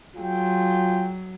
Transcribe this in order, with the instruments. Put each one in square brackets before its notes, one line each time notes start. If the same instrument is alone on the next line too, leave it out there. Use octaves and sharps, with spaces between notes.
[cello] F#3 [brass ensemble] F4 G#4 G5